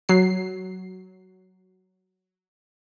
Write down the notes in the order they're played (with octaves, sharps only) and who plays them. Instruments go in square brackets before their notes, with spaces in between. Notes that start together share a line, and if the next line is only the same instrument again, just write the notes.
[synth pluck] F#3 C7